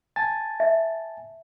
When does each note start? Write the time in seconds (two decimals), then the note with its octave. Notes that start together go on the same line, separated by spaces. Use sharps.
0.16 G#5 A5 A6
0.60 E5